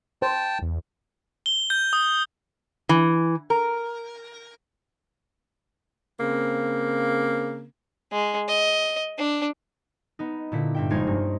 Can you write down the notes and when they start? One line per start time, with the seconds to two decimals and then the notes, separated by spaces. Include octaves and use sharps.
0.22 C5 G5 A5
0.62 E2
1.46 G7
1.70 G6
1.93 D#6
2.89 E3
3.50 A#4
6.20 C#3 A#3 C4
8.12 G#3
8.48 D#5
9.18 D4
10.19 B3 D#4
10.52 A#2 D3 E4 B6
10.75 G2 E5 G5
10.90 F1 G#3 D#4 C5 C#5 G#6
11.07 G2